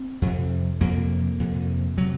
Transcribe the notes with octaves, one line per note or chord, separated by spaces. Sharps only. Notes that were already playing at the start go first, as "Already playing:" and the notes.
Already playing: C4
F2 C3
F2 C3 A#3
F2 C3
C3 F#3